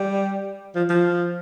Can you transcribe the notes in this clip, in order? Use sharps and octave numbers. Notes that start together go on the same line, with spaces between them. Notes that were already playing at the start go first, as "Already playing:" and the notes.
Already playing: G3
F3
F3